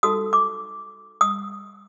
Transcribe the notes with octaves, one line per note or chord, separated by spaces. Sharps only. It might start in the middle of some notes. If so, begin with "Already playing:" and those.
D#4 F#4 A4 D#6
D6
D#6